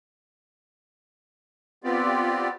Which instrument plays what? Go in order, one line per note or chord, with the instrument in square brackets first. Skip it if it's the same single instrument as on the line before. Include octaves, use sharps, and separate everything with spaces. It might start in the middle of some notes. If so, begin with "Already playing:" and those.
[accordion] B3 C4 F4 G4 D5